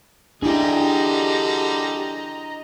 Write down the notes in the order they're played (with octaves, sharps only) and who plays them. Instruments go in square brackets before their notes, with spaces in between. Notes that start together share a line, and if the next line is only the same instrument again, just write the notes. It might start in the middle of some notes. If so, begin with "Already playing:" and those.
[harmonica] D3 G3 [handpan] D4 E4 [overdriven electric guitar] G4 G#4 [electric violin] D#5 A#5